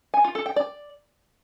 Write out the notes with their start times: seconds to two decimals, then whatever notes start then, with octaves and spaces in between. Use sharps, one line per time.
0.14 G#5
0.24 F4
0.35 A4
0.46 G5
0.56 D5